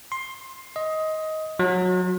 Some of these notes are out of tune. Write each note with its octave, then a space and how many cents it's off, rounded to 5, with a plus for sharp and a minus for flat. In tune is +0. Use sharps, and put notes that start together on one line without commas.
C6 +15
D#5 +15
F#3 -20